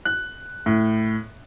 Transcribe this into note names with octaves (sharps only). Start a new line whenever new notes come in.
F#6
A2